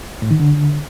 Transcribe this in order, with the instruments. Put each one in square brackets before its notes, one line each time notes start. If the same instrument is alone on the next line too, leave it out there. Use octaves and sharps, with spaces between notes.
[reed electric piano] A2
D#3
D3